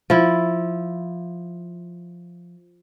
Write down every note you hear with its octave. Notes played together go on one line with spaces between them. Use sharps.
F3 E4